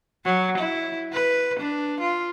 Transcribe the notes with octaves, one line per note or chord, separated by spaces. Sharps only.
F#3
E4
B4
D4
F4